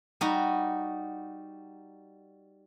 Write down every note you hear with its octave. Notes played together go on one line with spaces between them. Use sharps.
G3 D#4 F#4